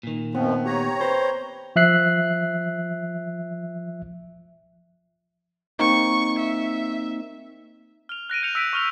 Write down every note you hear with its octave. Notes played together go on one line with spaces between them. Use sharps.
A#2 D#3
F#2 B2 F3 B3 C4
G4 C#5 A#5
B4 C5
F3 E5 F#6 C7
A#3 C4 D#4 C#6
E5
F6 F7
F#6 A#6 D7 D#7
G6 C#7 F7
E6 F6 B6 D7 D#7
C#6 F6 F7